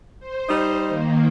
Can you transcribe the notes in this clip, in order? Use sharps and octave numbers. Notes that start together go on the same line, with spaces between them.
C5
G3 D#4
D#3 A#3